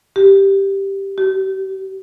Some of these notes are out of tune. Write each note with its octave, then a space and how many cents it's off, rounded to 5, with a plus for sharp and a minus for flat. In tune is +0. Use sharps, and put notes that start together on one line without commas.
G4 +0
G4 -40